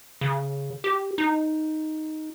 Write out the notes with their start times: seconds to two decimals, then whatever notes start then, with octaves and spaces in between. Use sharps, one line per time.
0.21 C#3
0.84 G4
1.18 D#4